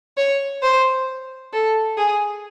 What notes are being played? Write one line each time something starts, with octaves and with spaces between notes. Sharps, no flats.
C#5
C5
A4
G#4